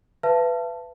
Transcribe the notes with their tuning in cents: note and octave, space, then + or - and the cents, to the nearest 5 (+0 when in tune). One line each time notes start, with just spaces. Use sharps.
B4 +10 E5 +45 A5 +5